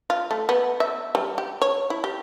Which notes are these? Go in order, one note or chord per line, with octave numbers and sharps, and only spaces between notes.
F4
A3
B3
E5
G3
G4
C#5
E4
G4